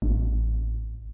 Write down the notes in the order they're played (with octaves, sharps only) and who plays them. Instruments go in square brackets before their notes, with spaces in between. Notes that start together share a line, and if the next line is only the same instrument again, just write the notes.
[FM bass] A1